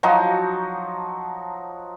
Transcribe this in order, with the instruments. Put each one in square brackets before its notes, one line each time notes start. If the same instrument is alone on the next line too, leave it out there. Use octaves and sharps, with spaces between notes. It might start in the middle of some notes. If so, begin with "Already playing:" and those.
[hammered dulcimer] F3 F#3 D#4 F#4